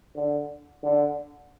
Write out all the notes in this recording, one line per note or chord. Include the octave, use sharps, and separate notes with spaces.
D3
D3